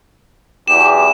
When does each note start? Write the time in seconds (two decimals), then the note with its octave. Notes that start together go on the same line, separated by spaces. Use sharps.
0.68 B1 E2 G4 E7